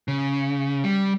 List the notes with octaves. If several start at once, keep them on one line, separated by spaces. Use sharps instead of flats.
C#3
G3